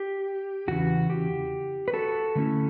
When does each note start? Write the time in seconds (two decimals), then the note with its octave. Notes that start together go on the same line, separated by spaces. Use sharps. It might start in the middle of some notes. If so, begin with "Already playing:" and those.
Already playing: G4
0.68 E2 C#3 E3 F#4
1.10 G4
1.88 B4
1.94 F#4 A4
2.35 D3 A3 C#4 E4